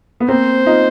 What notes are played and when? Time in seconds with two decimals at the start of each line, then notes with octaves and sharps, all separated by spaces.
0.20 B3
0.28 A#3 C4 C5
0.66 D#4 F4